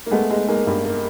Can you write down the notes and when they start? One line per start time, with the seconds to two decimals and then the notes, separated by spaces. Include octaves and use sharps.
0.06 A#3
0.11 G#3 A3 B3
0.31 G#3
0.48 G#3 A#3
0.67 G2
0.85 A#3